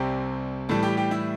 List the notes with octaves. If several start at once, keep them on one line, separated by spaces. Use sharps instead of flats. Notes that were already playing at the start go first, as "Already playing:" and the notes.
Already playing: C2 C3 G3 C4 G5 G6
A2 E3 G3 A4 A5
G4 G5
G4 G5
E4 E5